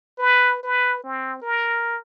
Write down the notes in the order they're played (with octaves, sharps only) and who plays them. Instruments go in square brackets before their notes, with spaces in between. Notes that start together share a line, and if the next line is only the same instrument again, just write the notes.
[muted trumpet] B4
B4
C4
A#4